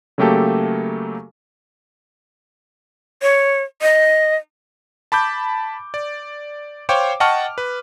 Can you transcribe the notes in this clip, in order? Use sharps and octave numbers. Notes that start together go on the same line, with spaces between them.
C#3 F#3 A3 A#3 G4 A4
C#5
D#5
A5 B5 D6 G6
D5
C5 C#5 F5 G5 C#6 D6
D#5 F#5 G5 A5 C#6 F6
B4